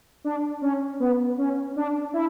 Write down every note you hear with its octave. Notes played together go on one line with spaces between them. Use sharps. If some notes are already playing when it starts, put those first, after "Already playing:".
D4
C#4
B3
C#4
D4
E4